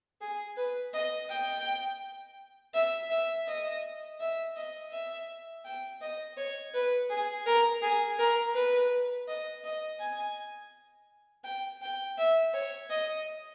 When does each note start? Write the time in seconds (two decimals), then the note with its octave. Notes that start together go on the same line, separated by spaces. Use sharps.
0.21 G#4
0.57 B4
0.94 D#5
1.30 G5
2.74 E5
3.10 E5
3.48 D#5
4.20 E5
4.56 D#5
4.91 E5
5.65 G5
6.01 D#5
6.37 C#5
6.74 B4
7.10 G#4
7.46 A#4
7.82 G#4
8.19 A#4
8.54 B4
9.28 D#5
9.64 D#5
10.00 G#5
11.44 G5
11.82 G5
12.18 E5
12.54 C#5
12.90 D#5